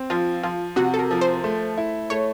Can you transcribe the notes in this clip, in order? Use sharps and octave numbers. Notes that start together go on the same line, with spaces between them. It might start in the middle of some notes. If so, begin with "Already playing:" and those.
Already playing: C4
F3 F4
F3 F4
C3 F#4
A4
A#4
F3
C5
A3
E4
A3 C#5